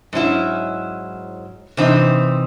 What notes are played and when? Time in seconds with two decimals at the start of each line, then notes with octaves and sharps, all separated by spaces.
0.13 G#2 F#3 C#4 E4
1.77 C3 E3 C4 D#4